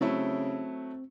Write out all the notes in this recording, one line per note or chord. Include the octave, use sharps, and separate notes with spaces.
C#3 F#3 A3 C4 E4